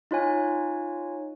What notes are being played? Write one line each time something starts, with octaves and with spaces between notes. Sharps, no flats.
D#4 F4 C#5 G#5